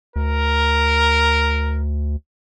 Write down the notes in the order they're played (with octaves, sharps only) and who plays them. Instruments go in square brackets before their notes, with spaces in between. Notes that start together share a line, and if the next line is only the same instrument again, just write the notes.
[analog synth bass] D2 [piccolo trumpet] A#4